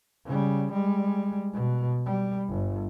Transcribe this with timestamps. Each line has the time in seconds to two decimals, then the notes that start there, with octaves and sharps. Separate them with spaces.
0.25 C#3 G3
0.72 G3 G#3
1.53 B2
2.06 G3
2.49 G1